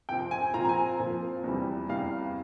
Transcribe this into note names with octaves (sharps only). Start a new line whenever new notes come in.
C3 F3 C4 G5
G#5
A#2 F3 C4 A#5
A#5
G#5
A#2 F3 C4
E2 C3 E3 G3
E2 C3 E3 G3 F5